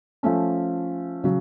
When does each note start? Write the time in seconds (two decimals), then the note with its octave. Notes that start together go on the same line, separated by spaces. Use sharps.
0.23 F3 A3 C#4
1.24 C#3 F#3